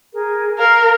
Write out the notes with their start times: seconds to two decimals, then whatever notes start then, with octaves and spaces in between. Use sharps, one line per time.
0.13 G#4 A#4
0.59 A#4 F5 F6